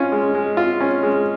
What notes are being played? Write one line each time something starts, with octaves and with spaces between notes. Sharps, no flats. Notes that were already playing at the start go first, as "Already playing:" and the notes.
Already playing: C#4 F4
G#3
G#3
F4
C#4
G#3